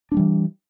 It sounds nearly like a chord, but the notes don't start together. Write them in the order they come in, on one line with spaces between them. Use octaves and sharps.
D4 A#3 G3 E3